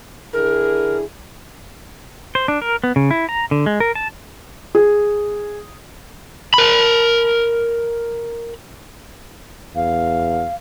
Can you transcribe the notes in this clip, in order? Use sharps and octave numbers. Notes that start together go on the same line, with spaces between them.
D3 E4 G#4 A#4
C5
D4
A#4
B3
C#3
E4
A#5
D3
G#3
A#4
A5
G#4
A#4 B5
E2 F5